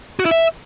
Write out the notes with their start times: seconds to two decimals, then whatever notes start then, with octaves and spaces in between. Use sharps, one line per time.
0.19 F#4
0.25 E4
0.31 E5